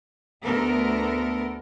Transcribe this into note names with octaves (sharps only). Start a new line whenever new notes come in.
D2 B3 A4 A#4